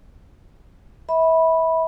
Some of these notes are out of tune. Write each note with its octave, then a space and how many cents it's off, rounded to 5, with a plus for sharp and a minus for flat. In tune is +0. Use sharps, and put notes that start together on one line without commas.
E5 -30 B5 -10